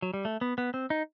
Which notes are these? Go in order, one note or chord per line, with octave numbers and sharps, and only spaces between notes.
F#3
G3
A3
B3
B3
C4
D#4